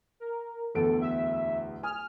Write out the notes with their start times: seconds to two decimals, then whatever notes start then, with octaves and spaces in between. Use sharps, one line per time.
0.20 A#4
0.75 D1 E2 A4 D7
1.01 E5
1.83 G#5 D#6 F6